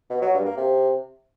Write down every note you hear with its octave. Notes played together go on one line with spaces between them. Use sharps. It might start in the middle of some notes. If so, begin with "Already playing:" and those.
B2
F#3
G2
A#3
C3